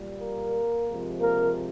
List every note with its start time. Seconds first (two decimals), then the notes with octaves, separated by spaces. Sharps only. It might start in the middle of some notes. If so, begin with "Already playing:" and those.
Already playing: A#2 G3
0.17 A#3 A#4
0.86 C3 F3 G#3
1.19 A#3 A#4